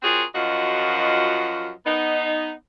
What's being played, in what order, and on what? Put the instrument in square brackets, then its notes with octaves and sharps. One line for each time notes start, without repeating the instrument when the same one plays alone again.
[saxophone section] C4 F4 F#4 G#4 A#4 C#5
F#2 F3 F4 F#4 D#5
B3 D#4